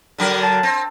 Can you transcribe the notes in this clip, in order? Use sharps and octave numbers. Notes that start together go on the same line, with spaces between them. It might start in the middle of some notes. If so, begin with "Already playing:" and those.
D3 F#3 A#4
A5
C4